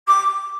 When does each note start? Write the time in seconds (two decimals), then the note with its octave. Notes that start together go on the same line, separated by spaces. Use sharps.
0.07 D6